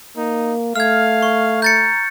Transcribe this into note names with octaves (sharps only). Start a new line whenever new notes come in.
A#3 D#4
A3 F5 F6 G#6
C#6
A#5 G6 A6 C#7